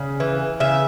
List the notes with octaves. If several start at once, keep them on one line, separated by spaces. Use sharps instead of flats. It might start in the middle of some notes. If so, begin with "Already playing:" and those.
Already playing: C#3
E3
C#3 E5